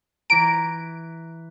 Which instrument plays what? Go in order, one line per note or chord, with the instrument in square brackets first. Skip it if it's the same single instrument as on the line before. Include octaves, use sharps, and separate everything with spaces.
[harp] E3 A#5 [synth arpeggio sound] D7